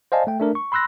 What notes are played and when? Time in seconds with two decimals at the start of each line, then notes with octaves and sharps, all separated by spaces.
0.12 C5 D5 D#5 F5 G#5 A5
0.27 A3 G5
0.40 A3 D4 A#4
0.55 C#6
0.72 B5 C6 E6 F#6 A#6